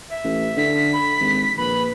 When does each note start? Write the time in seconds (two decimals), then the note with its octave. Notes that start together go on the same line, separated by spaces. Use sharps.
0.11 E5
0.24 A1
0.57 D3 B6
0.94 B5
1.20 G#1
1.57 A#1 B4 B5